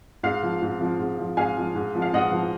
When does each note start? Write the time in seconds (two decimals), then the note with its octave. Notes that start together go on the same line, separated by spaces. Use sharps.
0.23 G#2 F5
0.43 F3
0.62 G#2
0.81 F3
0.99 G#2
1.19 F3
1.37 G#2 F5 G#5
1.57 F3
1.75 G#2
1.95 F3
2.02 F5
2.13 G#2 D#5 F#5
2.32 F3